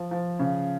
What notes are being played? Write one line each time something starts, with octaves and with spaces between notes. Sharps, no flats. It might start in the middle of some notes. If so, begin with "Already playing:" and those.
Already playing: F3
F3
C#3